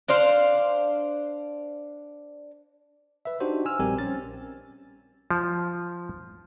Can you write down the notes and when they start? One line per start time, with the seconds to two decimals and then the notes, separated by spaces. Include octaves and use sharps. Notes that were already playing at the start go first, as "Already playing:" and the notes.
0.08 D4 C5 D5 F5
3.25 B4 E5
3.40 D4 D#4 F#4 G4 C5
3.65 G#5 E6 F6
3.79 A#1 G3 C4 G4 A#4 G#5
3.99 C#4 A6
5.31 F3